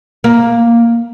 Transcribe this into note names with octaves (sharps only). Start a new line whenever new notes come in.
A#3